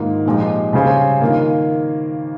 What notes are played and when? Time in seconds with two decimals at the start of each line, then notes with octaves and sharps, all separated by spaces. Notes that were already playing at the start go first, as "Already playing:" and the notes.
Already playing: G#2 D#3 A#3 F4
0.26 A#2 F3 G#3 D#4 G4
0.73 C#3 G3 C#4 G#4 C5
1.21 D#3 A#3 F4